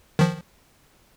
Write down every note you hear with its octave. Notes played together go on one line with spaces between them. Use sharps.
D#3 F3